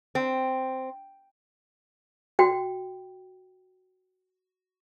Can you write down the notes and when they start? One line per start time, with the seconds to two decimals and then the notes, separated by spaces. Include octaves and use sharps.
0.15 C4
2.39 F#4 G5